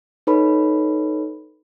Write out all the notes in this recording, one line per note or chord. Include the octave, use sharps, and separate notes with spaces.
D#4 A4 B4 C#5 B5